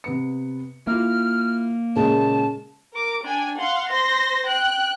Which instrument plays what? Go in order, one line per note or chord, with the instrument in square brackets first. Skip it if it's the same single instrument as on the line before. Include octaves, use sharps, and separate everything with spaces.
[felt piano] C3 B3 C#7
[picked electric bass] A#3 [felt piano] E4 F4 [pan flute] F6
[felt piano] A#2 G#3 [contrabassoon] C#3 [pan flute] A5
[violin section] A#4 D6
D4 G5 G#5
F5 F#5 C6
C5 C6 A#6
G5 F#6